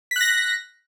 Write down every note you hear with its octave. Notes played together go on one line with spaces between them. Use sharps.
F#6 A#6 B6